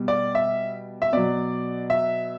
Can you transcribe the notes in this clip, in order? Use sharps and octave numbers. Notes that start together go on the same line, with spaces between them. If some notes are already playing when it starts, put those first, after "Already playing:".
Already playing: B2 G3
D5
E5
E5
B2 F#3 D5
E5